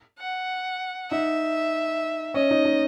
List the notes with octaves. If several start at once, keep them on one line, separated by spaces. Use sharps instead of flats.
F#5
D#4 E5
C#4 D#5
D#4
D#4